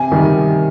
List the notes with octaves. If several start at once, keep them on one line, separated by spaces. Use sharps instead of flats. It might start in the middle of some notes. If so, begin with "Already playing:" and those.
Already playing: C3 G#5
D#3 G3